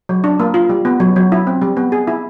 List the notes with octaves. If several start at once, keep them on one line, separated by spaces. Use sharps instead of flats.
F#3
D4
A#3
F4
G3
B3
F#3
F#3
E4
C4
G3
B3
G#4
E4